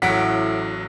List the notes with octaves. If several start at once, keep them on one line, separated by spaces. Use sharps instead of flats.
A1 A2 F#3 F#5 B6 D7